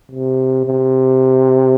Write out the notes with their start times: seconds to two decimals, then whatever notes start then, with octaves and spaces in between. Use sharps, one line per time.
0.11 C3
0.66 C3